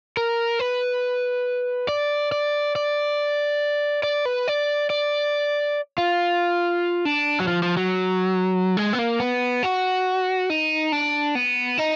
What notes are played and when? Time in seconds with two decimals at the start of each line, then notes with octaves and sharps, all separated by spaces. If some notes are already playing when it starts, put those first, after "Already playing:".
0.17 A#4
0.59 B4
1.89 D5
2.32 D5
2.76 D5
4.03 D5
4.25 B4
4.48 D5
4.90 D5
5.98 F4
7.05 D4
7.40 F#3
7.47 F3
7.62 F3
7.77 F#3
8.77 G#3
8.93 B3
8.99 A#3
9.20 B3
9.63 F#4
10.50 D#4
10.92 D4
11.35 B3
11.78 D#4